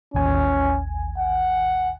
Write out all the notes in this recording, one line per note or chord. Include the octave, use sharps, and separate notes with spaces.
A1 D#2 C#4 G#5
F#5